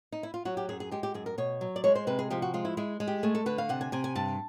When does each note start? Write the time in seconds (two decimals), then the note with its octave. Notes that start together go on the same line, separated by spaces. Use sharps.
0.12 D#4
0.23 E4
0.34 F4
0.45 F#3 F#4
0.57 G4
0.69 F#2 G#4
0.80 G#4
0.91 G#3 G4
1.03 G4
1.14 F#2 G#4
1.26 A#4
1.38 B2 C#5
1.61 F#3
1.76 D5
1.84 G#3 C#5
1.95 C5
2.07 C3 B4
2.19 G#4
2.30 F3 G4
2.42 F#4
2.54 G#3 F4
2.65 E4
2.77 G#3 E4
3.00 G#3
3.08 G4
3.23 A3 G#4
3.35 A4
3.46 D3 B4
3.58 F5
3.69 C3 F#5
3.81 G#5
3.92 C3 G#5
4.04 G#5
4.15 G2 A5